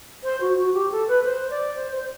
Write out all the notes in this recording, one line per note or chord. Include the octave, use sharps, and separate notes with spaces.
C5
F#4
F#4
G4
A4
B4
C5
D5
C5
C5